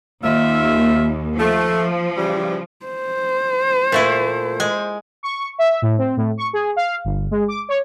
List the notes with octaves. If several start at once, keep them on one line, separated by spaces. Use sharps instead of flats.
D#2 F4 E5
F3 A3
C#3 E3 G3
C5
A#2 A3 E4
G#3 G#5
C#6
E5
A2
C4
A2
C#6
G#4
F5
G1
G#3
D6
C#5